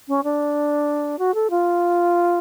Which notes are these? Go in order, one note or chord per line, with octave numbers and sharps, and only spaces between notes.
C#4
D4
F#4
A4
F4